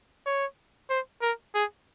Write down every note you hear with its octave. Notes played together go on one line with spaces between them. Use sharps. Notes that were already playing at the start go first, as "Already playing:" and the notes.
C#5
C5
A#4
G#4